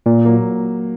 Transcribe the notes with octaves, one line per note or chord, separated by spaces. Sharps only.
A#2
F#3 A#3